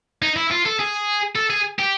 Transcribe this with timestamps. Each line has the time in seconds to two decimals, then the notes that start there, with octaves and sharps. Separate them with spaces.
0.22 D#4
0.36 E4
0.51 F4
0.65 A4
0.79 G#4
1.36 A4
1.50 G#4
1.79 G4